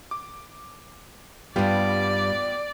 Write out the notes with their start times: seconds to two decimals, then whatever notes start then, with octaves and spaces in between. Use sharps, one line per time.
0.11 D6
1.56 G2 G3 B3 F4 G4 D5